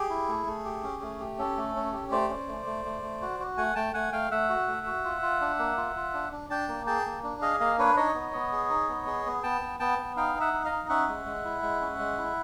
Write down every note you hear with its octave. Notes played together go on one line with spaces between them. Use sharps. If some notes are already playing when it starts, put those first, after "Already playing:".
Already playing: G4 G#4
E4
A3
A3
G4
C#4
A3
G4
C#4 A4
A3
C#4
G4
A3 C5 D5
C#4
A3
A3
A3
A3
F#4
F#4
A3 F#5 G#5
A3 G5 A5
A3 F#5 G#5
A3 F5 G5
A3 E5 F#5
F#4
A3
F#4
F4
F4
D4
A#3
F4
F4
D4
D4
D4 G5 A5
A#3
G#4 G5 A5
A#3
D4
G#4 D#5 F5
A#3 D#5 F5
D4 B4 C#5
D#4 C#5 D#5
B3
B3
G#4
D#4
B3
G#4
B3
B3 G5 A5
B3
B3 G5 A5
B3
D#4 F5 G5
D#4
E5 F#5
D#4
D#5 F5
D#4
C#4 E5 F#5
G#3
G#3
E4
G#3
C#4
G#3
E4